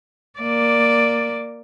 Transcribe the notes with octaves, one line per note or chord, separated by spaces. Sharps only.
A#3 D5